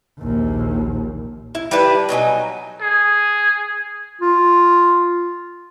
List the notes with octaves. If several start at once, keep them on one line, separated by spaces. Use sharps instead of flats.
A#1 D#2
E4
G3 D4 E4 B4
B2 F#3 D#4 G#5
G#4
F4